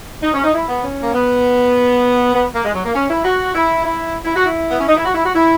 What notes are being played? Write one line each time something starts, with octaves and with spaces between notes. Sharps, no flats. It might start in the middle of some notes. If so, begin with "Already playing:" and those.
D#4
C#4
D#4
E4
B3
C#4
A#3
B3
B3
A#3
G#3
F#3
A#3
C#4
E4
F#4
E4
E4
E4
F#4
E4
B3
C#4
D#4
E4
F#4
E4
F#4
E4